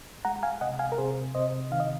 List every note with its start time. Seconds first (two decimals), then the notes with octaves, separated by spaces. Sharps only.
0.25 G#3 F#5 A#5
0.43 F5 G#5
0.61 C3 D#5 F#5
0.79 F5 G#5
0.92 A#4
0.98 C3 G#4 C5
1.35 C3 C5 D#5
1.71 D#3 F5
1.80 D#5